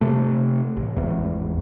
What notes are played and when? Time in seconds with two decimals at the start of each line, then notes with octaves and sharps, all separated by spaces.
0.01 C3 A3
0.77 A1
0.97 G#1 E2